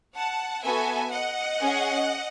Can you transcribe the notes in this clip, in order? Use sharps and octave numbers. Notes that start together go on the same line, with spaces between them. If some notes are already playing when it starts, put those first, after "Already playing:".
F#5 A5
B3 F#4 A4 E5 G#5
D#5 F#5
C#4 G#4